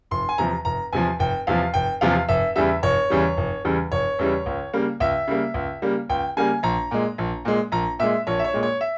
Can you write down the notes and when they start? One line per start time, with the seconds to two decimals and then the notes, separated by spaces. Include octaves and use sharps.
0.11 F1 C6
0.29 G#5
0.38 E2 C3 F3 A#5
0.65 F1 A#5
0.93 E2 C3 F3 G#5
1.19 F1 G5
1.47 E2 C3 F3 F5
1.74 F1 G5
2.01 E2 C3 F3 F5
2.29 F1 E5
2.56 E2 C#3 E3 G3 E5
2.83 F1 C#5
3.10 E2 C#3 E3 G3
3.37 F1
3.65 E2 C#3 E3 G3
3.92 F1 C#5
4.19 E2 C#3 E3 G3
4.46 C#2
4.73 C#3 G3 A#3
5.00 C#2 E5
5.28 C#3 G3 A#3
5.54 C#2
5.82 C#3 G3 A#3
6.09 C#2 G5
6.37 C#3 G3 A#3 G#5
6.63 A#1 A#5
6.91 A#2 G#3
7.18 A#1
7.45 A#2 G#3
7.72 A#1 A#5
7.99 A#2 G#3 E5
8.27 A#1 C#5
8.39 E5
8.44 C#5
8.54 A#2 G#3
8.63 C#5
8.81 E5